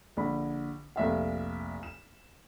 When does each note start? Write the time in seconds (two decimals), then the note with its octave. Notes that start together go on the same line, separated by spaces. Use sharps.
0.17 A#1 D3 B5
0.96 F1 A#1 E5 F5
1.83 E7